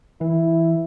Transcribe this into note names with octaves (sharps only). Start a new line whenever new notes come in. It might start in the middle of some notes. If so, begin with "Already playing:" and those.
E3 E4